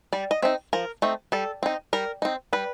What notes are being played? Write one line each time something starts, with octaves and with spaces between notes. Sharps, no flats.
G3 D5
D#5
C4 D#4 E5
F3 A#4
A3 C4 D#4
G3 A4
C4 D#4
G3 A#4
C4 D#4
G3 B4